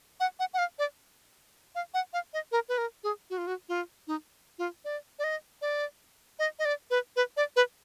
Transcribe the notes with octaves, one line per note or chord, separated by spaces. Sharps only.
F#5
F#5
F#5
F5
D5
F5
F#5
F5
D#5
A#4
B4
A#4
G#4
F#4
F4
F#4
F4
D#4
F4
D5
D5
D#5
D5
D#5
D#5
D5
B4
B4
D5
B4